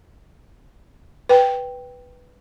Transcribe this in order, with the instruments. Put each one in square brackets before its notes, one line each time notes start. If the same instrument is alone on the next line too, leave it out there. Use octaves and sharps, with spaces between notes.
[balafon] B4 G5